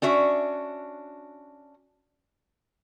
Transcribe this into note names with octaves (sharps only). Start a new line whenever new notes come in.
C#4 D4 F#4 E5